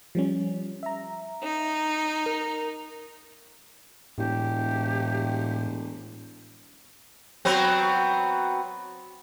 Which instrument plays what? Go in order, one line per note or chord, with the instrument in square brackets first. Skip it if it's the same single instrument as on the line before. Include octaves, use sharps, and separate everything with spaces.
[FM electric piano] F3 G3 C#4
E5 A#5
[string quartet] D#4
[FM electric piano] A#4
[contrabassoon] E1 [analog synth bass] A2 [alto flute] G4
[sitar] F#3 B3 C4